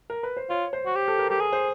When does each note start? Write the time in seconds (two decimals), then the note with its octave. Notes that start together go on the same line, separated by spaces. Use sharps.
0.10 A#4
0.23 B4
0.37 C5
0.50 F4 C#5
0.73 C5
0.86 F#4
0.95 G4
1.08 A4
1.19 A#4
1.30 G4
1.40 G#4
1.53 C5